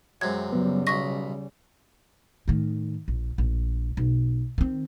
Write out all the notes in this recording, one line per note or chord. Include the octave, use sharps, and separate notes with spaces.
F#2 C3 G#3 G#6
C#3 F#3 G3 B3
B1 D#5 C#6 A#6 B6
A2 D#3
A#1
A#1
B1
D#3 C4